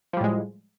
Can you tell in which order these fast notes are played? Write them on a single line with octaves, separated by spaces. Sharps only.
F3 G3 A2 G#3